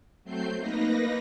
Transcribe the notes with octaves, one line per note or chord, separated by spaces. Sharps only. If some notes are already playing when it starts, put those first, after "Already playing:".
F#3 A3 C4 G6 C7
A#3 D#4 B4 A#6